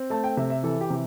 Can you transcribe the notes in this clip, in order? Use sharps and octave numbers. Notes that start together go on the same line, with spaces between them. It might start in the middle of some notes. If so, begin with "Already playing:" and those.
Already playing: C4
A3 A5
G5
C3 E5
E5
E3 A4
G4
C3